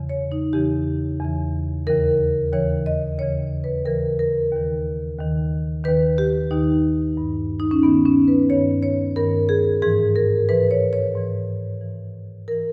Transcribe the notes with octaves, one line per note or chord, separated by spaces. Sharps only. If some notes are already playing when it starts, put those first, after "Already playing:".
Already playing: E2 C#3 E3
C#5
D#4
E2 C#3 E3 G4
E2 C#3 E3
D#2 C#3 E3 A#4
D#2 C#3 E3 C#5
D#5
D#2 C#3 E3 C#5
B4
D#2 C#3 E3 A#4
A#4
D#2 D#3
D#2 D#3
D#2 D#3 B4
G4
D#2 D#3 D#4
G2 D#3
D#4
C#4
G2 D#3 B3
C#4
B4
G2 D#3 C#5
C#5
G2 D#3 A#4
G#4
G#2 E3 G#4
A#4
G#2 E3 B4
C#5
C#5
G#2 E3
G#2 E3
E3 A#4